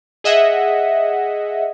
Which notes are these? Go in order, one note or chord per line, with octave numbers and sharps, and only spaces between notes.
G#4 D#5 E5 F#5